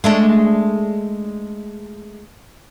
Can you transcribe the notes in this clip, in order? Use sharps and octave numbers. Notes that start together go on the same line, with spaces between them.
G#3 A3 D4